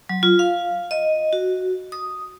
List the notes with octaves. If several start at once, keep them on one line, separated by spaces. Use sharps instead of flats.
F#3
F4
F5
D#5
F#4
D#6